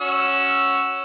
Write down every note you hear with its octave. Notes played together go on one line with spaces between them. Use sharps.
C#4 F#4 E6